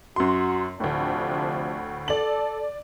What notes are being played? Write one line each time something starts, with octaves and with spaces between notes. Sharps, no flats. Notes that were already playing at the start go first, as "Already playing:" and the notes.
F#2 F#4 C6
D2 A2 C3 F3 D4
A4 D5 F#7